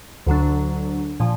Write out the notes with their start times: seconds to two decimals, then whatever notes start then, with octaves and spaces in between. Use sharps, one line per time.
0.27 D2 D3 F#3 D4
1.20 A#2 F3